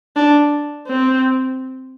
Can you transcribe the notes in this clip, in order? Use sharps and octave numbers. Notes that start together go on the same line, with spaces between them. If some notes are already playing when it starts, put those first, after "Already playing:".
D4
C4